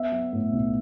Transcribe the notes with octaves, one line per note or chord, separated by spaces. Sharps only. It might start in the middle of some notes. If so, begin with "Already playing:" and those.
Already playing: B3 E5
F#3
A2
B1